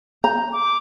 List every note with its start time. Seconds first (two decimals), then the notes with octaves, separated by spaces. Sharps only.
0.24 A#5 G6
0.52 D6